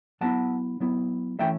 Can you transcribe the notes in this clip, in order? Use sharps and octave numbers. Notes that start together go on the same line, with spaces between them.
F#3 B3 E4 F#5 A5
F#3 B3 E4
E3 A3 C#4 E4 E5 G5